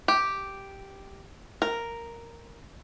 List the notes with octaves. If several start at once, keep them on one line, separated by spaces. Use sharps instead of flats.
G4
A#4